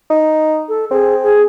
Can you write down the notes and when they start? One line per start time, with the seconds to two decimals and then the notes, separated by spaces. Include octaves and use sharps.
0.10 D#4
0.69 A4
0.91 C4 G#4
1.22 G#4